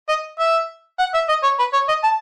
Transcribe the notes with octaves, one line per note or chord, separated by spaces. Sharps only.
D#5
E5
F#5
E5
D#5
C#5
B4
C#5
D#5
A5